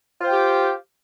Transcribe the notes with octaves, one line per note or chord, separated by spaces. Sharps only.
F4 G4 C5 G5